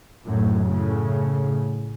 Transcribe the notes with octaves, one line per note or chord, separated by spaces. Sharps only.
F#2 A2
A2 C#3